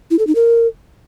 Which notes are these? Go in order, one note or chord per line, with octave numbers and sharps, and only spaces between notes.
E4
A4
D#4
A#4